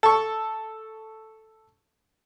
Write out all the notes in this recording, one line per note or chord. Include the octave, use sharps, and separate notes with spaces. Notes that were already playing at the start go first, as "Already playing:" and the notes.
A4 C#6